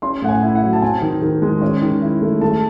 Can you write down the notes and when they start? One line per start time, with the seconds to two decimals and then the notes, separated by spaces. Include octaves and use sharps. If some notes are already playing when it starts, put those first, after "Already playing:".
0.02 C#4 C6
0.22 A2 F#5
0.29 G#5
0.42 E4
0.55 F#5
0.62 F#3
0.73 A5
0.82 C4 G#5
1.02 D#3
1.22 D#3
1.42 G#3
1.62 C#4
1.82 D#3
2.01 E4
2.22 A3
2.41 A3 A5